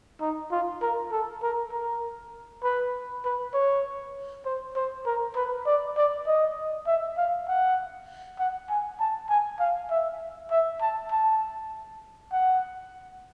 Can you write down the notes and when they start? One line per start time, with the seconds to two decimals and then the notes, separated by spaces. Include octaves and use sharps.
0.21 D#4
0.51 F4
0.82 A#4
1.11 A4
1.42 A#4
1.72 A#4
2.63 B4
3.24 B4
3.54 C#5
4.45 C5
4.76 C5
5.06 A#4
5.36 B4
5.66 D5
5.97 D5
6.27 D#5
6.87 E5
7.17 F5
7.48 F#5
8.38 F#5
8.69 G#5
9.00 A5
9.29 G#5
9.59 F5
9.90 E5
10.51 E5
10.81 A5
11.11 A5
12.32 F#5